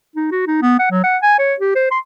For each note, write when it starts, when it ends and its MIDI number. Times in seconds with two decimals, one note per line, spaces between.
0.16 0.31 63
0.31 0.44 66
0.47 0.58 63
0.62 0.78 59
0.79 0.88 78
0.91 1.01 54
1.04 1.17 78
1.22 1.35 80
1.39 1.55 73
1.60 1.75 67
1.75 1.90 72
1.91 1.99 84